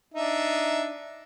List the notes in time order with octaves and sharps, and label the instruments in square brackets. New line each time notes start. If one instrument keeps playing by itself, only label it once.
[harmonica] D4 D#4 E5